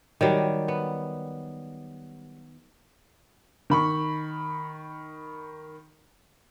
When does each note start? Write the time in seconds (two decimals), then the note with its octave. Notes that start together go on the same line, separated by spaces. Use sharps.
0.21 D#3 F#3 G3
0.68 B3
3.70 D#3 B5 C#6